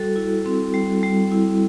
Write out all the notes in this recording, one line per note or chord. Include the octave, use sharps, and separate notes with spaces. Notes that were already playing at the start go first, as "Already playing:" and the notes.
Already playing: G3 F#4 A4
E4
C4
G3
G3
E4